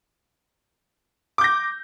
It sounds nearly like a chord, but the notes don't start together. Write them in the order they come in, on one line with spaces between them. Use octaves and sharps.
D6 G6 A#6